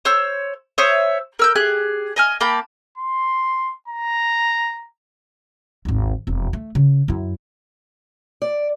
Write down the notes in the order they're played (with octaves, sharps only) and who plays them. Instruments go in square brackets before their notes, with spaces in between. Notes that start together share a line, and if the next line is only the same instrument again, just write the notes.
[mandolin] C5 C#5 E6
C5 C#5 E5 D#6
A#4 E6 G6
G4 G#4 F#6
D#5 G#5 F6
A#3 G5 A5 B5
[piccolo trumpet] C6
A#5
[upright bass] G#1 D#2
E1 F2
A3
C#3
F#2 E4
[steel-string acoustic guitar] D5